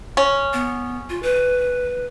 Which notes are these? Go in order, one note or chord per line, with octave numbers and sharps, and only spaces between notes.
C#4
B3
F4
B4